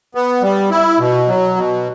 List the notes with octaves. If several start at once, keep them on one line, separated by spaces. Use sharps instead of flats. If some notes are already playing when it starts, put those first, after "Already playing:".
B3
G3
E4
B2
F#3
B2